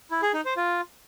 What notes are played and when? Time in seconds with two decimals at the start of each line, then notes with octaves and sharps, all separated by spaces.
0.11 E4
0.22 G#4
0.34 D#4
0.45 C5
0.57 F4